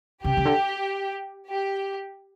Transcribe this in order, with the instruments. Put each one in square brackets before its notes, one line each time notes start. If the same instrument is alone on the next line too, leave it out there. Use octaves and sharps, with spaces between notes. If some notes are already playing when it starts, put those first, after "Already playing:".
[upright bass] C#3 [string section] G4
[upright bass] C#3
D3
[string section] G4